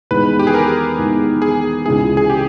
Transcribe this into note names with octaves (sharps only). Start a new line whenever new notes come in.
E2 D#3 G#3 B4
G4
G#4
A#4
E2 D#3 G#3
G#4
C#2 C#3 E3 G#3 G#4
G#4
G4